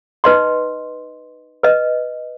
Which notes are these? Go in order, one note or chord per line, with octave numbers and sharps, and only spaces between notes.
D#4 B4 D#5 C6
B4 D#5